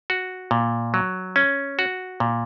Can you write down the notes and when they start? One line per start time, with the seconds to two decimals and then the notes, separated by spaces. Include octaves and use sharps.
0.10 F#4
0.51 A#2
0.94 F#3
1.36 C#4
1.79 F#4
2.20 A#2